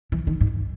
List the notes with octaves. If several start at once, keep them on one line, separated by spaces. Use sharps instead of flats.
E3
D#3
G#2